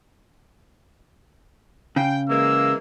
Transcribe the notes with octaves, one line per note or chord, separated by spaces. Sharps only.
C#3 G5
E3 G#3 A#3 E6